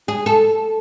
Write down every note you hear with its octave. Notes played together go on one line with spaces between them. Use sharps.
G#4
A4